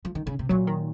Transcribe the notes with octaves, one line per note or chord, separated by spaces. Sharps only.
F3
D#3
C#3
C3
A#2 F#3
D#3